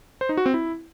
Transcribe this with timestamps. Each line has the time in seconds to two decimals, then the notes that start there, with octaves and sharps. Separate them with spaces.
0.21 C5
0.29 D#4
0.37 F#4
0.46 C4
0.54 E4